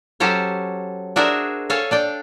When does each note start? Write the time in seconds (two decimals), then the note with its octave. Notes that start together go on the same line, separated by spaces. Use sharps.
0.20 F#3 C#4 G4 A4 C5 C#5
1.16 D4 F#4 G#4 A#4 C5 E5
1.70 A4 C#5 F5 G#5 A5
1.91 D4 D5 G5